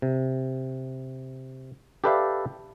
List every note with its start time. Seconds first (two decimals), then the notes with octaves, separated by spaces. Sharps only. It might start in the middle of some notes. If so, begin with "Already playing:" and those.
0.02 C3
2.04 G4 A4 B4 D5 E5 F5